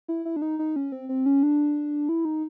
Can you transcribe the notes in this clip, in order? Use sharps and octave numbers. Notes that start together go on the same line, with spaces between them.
E4
E4
D4
D#4
D#4
C#4
C4
C4
C#4
D4
E4
D#4